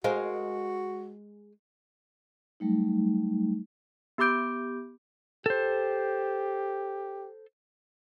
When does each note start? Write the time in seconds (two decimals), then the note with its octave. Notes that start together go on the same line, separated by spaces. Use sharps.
0.04 G#3 F#4 A#4 C5 F5
2.60 F#3 G3 A3 D#4
4.18 B3 G4 B5 D6 G6 D7
5.46 G4 A4 C5